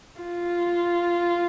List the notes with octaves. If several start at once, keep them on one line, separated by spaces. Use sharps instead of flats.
F4